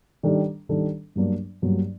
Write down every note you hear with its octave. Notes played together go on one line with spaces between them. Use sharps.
D#3 G3 D4 A4
D#3 G3 D4 A4
G2 F#3 A#3 D4
G2 F#3 A#3 D4